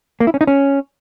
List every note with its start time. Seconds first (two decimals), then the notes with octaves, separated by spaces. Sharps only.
0.20 A#3
0.27 E4
0.34 C#4
0.41 D#4
0.47 C#4